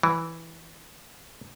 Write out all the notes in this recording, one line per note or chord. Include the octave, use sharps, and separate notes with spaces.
E3